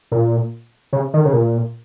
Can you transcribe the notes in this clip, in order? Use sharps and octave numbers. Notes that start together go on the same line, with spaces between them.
A#2
C#3
D#3
C#3
A#2